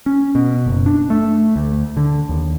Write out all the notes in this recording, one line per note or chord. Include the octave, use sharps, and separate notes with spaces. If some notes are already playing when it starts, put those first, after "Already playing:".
C#4
B2
F#1
D4
A3
D2
D3
D#2